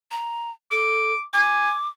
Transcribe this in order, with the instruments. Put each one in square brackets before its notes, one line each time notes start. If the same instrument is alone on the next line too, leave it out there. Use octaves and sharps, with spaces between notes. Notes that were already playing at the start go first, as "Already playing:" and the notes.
[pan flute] A#5
[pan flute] A4 [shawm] D6
[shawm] G#5 [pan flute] D6